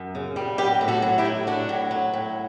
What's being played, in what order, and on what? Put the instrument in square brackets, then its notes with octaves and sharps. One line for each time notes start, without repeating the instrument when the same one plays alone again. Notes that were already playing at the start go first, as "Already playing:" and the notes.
Already playing: [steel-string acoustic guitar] F#2
C#3
G3
F#3 G4 B4
A2
F#4 A4
F#3
E4 G4
A2
F#3 D4 F#4
A2
F#3
A2